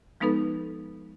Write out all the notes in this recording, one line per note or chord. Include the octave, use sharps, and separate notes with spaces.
F3 G#3 B3 D#4 A4 B4